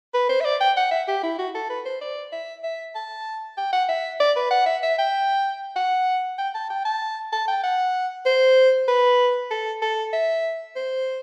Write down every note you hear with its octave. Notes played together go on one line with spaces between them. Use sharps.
B4
C5
E5
D5
G5
F#5
E5
G4
E4
F#4
A4
B4
C5
D5
E5
E5
A5
G5
F#5
E5
D5
B4
F#5
E5
E5
G5
F#5
G5
A5
G5
A5
A5
G5
F#5
C5
B4
A4
A4
E5
C5